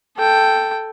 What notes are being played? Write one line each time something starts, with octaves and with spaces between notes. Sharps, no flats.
A4 G5